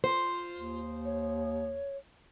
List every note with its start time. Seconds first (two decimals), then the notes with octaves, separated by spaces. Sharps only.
0.04 F4 C5
0.53 D#2
1.04 C#5